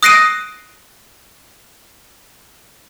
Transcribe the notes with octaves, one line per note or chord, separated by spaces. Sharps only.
D#6 F#6 A#6 C7 D7 D#7